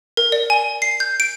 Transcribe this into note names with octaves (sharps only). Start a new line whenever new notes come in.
A#4
D5
G#5
C7
G6
D7